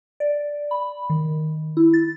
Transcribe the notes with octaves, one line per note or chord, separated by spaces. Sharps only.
D5
B5
D#3
E4
A6